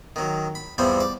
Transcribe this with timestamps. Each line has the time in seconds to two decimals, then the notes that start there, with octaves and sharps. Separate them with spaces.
0.16 D#3 F#3
0.55 B5
0.78 E2 C3 F3 G3 C4
1.00 D5